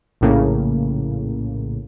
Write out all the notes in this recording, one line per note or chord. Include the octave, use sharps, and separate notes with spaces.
A#1 A2 C#3 A#3